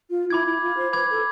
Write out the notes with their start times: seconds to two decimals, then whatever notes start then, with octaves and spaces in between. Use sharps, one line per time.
0.10 F4
0.30 E4 B5 D6 G#6
0.46 E4
0.62 F4
0.78 C5
0.93 B4 B5 D6 G#6
1.09 A4